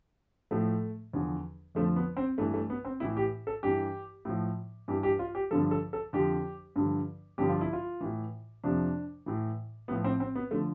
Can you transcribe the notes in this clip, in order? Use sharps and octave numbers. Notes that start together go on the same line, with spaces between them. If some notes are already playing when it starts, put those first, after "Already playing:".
A2 F3 A3
E2 D3 F3
F2 D3 F3 A3
B3
C4
G2 E3 A3
A3
B3
C4
A2 E3 E4
G4
A4
G2 E3 G4
A2 F3
G2 E3 G4
G4
F4
G4
G2 D3 F3 A4
A4
A4
F2 D3 F3 G4
G2 D3 F3
G2 D3 F3 G4
F4
E4
F4
A2 E3
F2 C3 F3 D4
A2 E3
A2 F3 B3
C4
C4
B3
D3 F3 A3